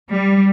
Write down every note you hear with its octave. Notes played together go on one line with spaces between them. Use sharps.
G3